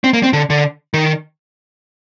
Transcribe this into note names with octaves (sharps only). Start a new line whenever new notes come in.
C4
A#3
C4
D3
D3
D#3